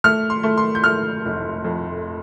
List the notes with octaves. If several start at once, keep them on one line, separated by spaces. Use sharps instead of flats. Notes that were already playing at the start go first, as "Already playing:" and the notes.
A3 F6
C6
A3
C6
G6
A3 F6
F1
F2